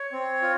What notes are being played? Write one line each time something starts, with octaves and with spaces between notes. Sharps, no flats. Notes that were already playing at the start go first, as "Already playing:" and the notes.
Already playing: C#5
C4
F4